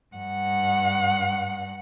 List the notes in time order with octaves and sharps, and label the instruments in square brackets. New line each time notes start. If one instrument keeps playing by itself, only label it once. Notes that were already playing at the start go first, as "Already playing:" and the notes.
[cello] G2 F#5